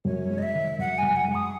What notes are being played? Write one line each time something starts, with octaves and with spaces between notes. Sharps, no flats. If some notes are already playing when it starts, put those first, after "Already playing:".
F#2 C#5
G#3
D#5
E5
D#3
F#2 F#5
G#5
F#2
F#5
G#3
D#6